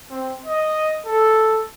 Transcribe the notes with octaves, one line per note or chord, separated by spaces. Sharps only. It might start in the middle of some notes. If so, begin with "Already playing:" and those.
C4
D#5
A4